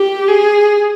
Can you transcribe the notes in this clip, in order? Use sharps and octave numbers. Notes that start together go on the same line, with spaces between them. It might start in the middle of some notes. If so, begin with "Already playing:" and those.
Already playing: G4
G#4